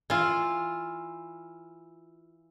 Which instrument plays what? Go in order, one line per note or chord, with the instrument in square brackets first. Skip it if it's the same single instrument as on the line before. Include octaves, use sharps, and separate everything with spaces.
[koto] E3 F4